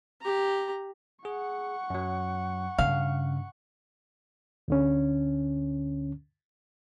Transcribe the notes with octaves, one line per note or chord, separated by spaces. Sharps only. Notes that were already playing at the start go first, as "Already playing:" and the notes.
G4 A#5
G#4 F#5 C#6
F#2 F#3
G2 C#3 F5
D2 D3 C#4